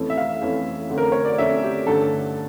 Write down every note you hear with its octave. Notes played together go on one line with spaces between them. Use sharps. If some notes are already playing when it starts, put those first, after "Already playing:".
Already playing: F2 E3 A3 C#4
E5
F5
F2 E3 A3 C#4
F2 D3 A3 C#4
A#4
C#5
D5
F2 D3 A3 C#4 E5
G4
G2 D3 A3 C#4 A4